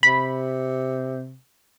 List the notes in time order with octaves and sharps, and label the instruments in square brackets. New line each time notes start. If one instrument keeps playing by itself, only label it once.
[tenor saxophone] C3 [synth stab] B5